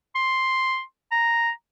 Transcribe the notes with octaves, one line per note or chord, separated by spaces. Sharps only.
C6
A#5